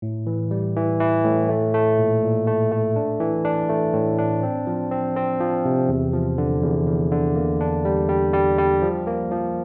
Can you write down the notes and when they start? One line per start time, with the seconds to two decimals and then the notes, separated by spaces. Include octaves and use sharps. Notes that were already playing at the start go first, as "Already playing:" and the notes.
0.02 A2
0.26 E3
0.51 G3
0.76 E3
1.00 E3
1.24 A2
1.49 A3
1.74 A3
1.99 A#2
2.22 A#2
2.47 A3
2.72 A3
2.96 D4
3.20 E3
3.45 D4
3.69 A3
3.93 A2
4.18 D4
4.43 C4
4.67 F3
4.91 C4
5.16 C4
5.40 F3
5.65 C3
5.89 E2
6.13 F3
6.38 D3
6.63 E2
6.87 E2
7.12 D3
7.36 A#3
7.61 D4
7.85 G3
8.09 G3
8.34 G3
8.59 G3
8.82 F3
9.07 A#3
9.32 F3